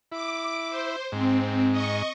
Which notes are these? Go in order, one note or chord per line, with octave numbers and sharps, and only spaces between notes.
E4 D6
C5
G#2 C4
D#5 C#6